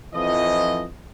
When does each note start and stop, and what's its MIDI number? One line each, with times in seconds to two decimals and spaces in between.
0.15 0.85 41
0.15 0.85 52
0.15 0.85 53
0.15 0.85 75